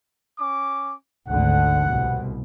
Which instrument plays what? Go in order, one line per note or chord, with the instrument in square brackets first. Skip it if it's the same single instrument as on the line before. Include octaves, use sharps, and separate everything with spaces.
[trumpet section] C#4 D6
[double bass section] G#1 D2 D3 [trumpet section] F#5
[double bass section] C2 B2